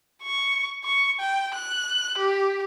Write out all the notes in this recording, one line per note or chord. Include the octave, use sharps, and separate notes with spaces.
C#6
C#6
G5
F#6
G4